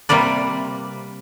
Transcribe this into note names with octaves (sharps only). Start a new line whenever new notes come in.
C3 G3 A#3 B4 D5